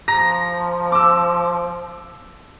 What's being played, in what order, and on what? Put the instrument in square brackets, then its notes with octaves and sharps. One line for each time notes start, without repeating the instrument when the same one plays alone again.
[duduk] F3 [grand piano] A#5 A#6
[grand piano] D6 E6